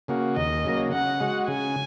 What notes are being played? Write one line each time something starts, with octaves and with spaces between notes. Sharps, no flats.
C#3 A#3 F#4
D#2 D#5
C#3 F#3 A#3
C#3 F#5
G#3 F#4
C#3 G#5